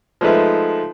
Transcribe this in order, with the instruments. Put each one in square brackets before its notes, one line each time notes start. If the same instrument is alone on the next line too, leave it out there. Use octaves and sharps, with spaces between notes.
[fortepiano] F3 G#3 A3 D#4 B4 E5